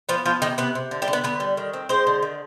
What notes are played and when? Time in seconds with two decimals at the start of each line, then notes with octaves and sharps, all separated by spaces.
0.09 F3 B3 F4
0.25 F3 B3 F4
0.42 C3 D#3 D#4
0.58 C3 B3 B4
0.75 C3
0.91 D3
1.02 G3 G4
1.08 D3
1.13 B3 B4
1.24 D3 B3 B4
1.40 G3
1.57 D#3
1.73 C4
1.89 G#3 C4 C5
2.07 D3
2.23 D#3